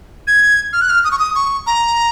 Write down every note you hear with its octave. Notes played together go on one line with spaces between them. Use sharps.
G#6
F6
F#6
F6
D#6
C#6
D#6
C#6
A#5